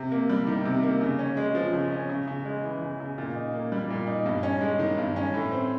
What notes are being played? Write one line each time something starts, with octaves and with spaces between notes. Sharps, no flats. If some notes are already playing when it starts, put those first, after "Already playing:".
Already playing: C3
A#3
G3
D#3
C3
A#3
C#3
C#4
G#3
F3
C#3
C#4
C#3
C#3
G#3
E3
C#3
C#3
A#2
D#4
A#3
G3
A#2
D#4
G2
C#4
G#3
D#3
G2
C#4
A2
C4